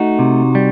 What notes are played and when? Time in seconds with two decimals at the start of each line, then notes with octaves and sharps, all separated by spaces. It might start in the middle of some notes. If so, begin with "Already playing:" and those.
Already playing: A3 D#4 F#4
0.19 C3
0.55 G3